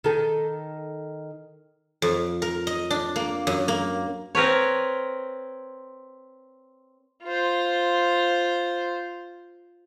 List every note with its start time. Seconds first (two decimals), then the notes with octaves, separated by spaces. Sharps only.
0.04 D#3 A4
2.02 F2
2.42 A#4
2.67 D#5
2.90 D4
3.16 A#3
3.47 F#2
3.68 A#3
4.35 C4 A#4 B4 C#5
7.24 F4 C5